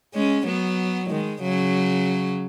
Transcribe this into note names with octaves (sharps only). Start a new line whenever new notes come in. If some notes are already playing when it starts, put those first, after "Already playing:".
G#3 C#4
F#3 B3
D#3 G#3
C#3 F#3